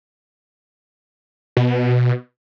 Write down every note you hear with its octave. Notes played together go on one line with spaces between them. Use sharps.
B2